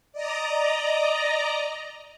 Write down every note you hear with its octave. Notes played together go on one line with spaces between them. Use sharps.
D5 D#5 A#5